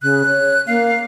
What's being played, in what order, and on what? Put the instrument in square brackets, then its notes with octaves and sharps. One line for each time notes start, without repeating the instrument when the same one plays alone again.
[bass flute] C#3 [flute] F#6
[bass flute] C#5
[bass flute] A#3 [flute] F5